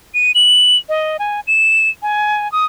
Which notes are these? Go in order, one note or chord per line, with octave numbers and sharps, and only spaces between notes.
D#7
F#7
D#5
G#5
E7
G#5
D#6